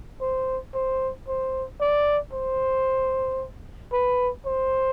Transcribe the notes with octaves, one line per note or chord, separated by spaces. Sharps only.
C5
C5
C5
D5
C5
B4
C5